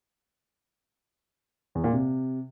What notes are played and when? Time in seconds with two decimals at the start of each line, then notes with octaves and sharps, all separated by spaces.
1.75 E2
1.84 A#2
1.93 C3